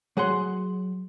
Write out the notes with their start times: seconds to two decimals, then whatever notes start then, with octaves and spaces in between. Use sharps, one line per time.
0.17 F#3 G#4 F#5 C6